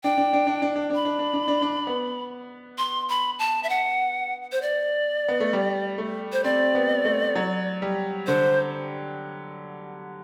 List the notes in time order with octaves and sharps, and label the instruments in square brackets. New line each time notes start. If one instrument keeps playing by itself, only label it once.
[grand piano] D4 [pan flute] G5
[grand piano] D4
D4
D4
D4
D4
D4
[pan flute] B5
[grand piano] D4
D4
D4
D4
D4
B3
[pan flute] C6
B5
A5
E5
F#5
C5
D5
[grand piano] B3
A3
G3
A3
[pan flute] C5
[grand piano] C4 [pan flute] D5
[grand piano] B3
A3
F#3
G3
[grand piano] D3 [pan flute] C5